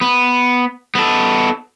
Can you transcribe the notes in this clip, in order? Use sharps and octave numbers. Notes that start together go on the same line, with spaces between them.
B3
B3 A4